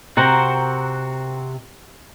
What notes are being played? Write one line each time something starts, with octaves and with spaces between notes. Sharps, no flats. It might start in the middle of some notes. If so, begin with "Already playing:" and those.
C3 C4 F#4 A#4 C5 F#5